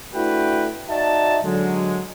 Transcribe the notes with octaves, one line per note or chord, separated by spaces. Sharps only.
A3 D4 E4 F#4 B4 G5
D#4 F#4 D5 E5 A5
D3 F#3 G#3